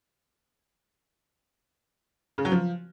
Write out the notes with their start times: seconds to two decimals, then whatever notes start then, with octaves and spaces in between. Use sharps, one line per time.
2.38 C#3
2.45 F#3
2.52 F3